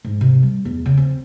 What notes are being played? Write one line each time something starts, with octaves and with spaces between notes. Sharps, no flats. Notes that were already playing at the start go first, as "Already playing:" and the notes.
G#2
C3
G3
E2
C#3
C4